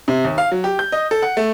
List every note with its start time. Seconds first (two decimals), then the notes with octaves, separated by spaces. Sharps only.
0.08 C3
0.25 D#2
0.38 F5
0.52 F#3
0.64 G4
0.79 G6
0.92 D#5
1.11 A4
1.22 F#5
1.37 A3